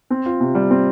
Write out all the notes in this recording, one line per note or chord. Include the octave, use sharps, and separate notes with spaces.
C4
F4
C3
G3
C4